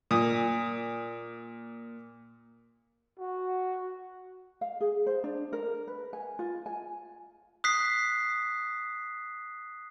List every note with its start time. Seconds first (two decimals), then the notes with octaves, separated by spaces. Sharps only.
0.11 A#2 D#6
3.19 F#4
4.61 F5
4.81 G#4
5.06 C5
5.24 D4
5.53 A#4
5.87 B4
6.13 G#5
6.39 F4
6.66 G#5
7.64 D#6 F#6 B6 C7